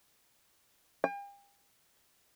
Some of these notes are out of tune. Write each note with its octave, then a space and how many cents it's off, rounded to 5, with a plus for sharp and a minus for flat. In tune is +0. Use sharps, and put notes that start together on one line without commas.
G5 +40